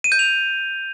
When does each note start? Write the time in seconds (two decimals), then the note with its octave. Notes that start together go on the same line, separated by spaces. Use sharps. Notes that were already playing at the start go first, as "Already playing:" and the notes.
0.04 D#7
0.12 G6
0.19 F7